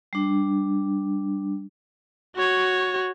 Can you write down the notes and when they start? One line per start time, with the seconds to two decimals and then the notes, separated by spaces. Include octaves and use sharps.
0.13 G3 D4
2.36 F#4 C#5